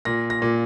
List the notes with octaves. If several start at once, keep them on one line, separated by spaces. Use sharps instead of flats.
A#2 A#6
A#6
A#2